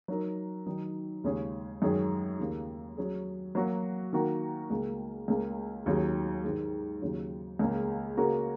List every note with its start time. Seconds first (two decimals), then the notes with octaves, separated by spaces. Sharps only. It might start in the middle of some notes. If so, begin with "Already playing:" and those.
0.08 F#3 D#4 A#4
0.66 D#3 F#3 D#4
1.24 D#2 C#3 G#3 C#4 G#4
1.82 F#2 D#3 G#3 C#4 G#4
2.39 D#2 C#3 A#3
2.97 F#3 C#4 G#4
3.55 F#3 A#3 F#4
4.13 D#3 A#3 F#4 A#4
4.70 C#2 C#3 A#3
5.28 C#2 C#3 A#3
5.86 D#2 D#3 F#3 C#4 G#4
6.44 G#2 D#3 G#3
7.02 D#2 C#3 F#3 C#4
7.59 C#2 C#3 A#3
8.17 C#3 A#3 F#4 A#4